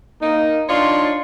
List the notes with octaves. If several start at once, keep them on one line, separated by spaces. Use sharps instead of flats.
A#3 D#4
D4 D#4 F4 C#5 D5 C6